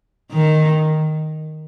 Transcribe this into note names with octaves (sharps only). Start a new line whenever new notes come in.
D#3